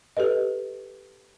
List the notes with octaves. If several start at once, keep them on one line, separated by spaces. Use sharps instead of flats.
G4 A4 B4 D#5